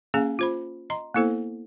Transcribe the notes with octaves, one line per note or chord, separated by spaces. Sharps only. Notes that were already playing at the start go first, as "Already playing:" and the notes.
A#3 C#4 G#4 F5 G#5
F4 C5 B5
D#5 A#5 C6
A#3 B3 E4 A4 C5